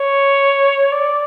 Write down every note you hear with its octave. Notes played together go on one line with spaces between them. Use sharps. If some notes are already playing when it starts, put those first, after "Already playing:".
Already playing: C#5
D5